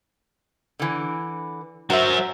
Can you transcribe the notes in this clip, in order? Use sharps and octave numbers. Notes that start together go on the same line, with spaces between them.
D3 E3
F#3 F#4 A#4 C5 E5